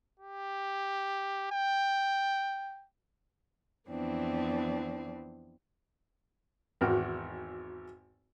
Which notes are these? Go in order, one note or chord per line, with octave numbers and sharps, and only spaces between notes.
G4
G5
F2 E3 B3 C4 D4
G#1 E2 F#4 G5 F6